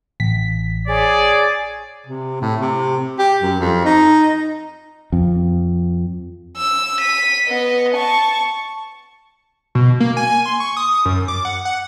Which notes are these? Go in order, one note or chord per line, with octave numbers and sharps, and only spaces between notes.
A1 B6
G#4 C#5 D5
C3
A2
C3
G4
F#2
F2
D#4
F2
E6
B6 D#7
B3 D#5
A5 C#6
B2
A#3
G#5
C6
C#6
D#6
F#2
D6
F#5
F#5